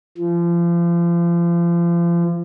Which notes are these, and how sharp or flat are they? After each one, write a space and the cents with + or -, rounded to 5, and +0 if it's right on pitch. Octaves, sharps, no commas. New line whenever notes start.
F3 -35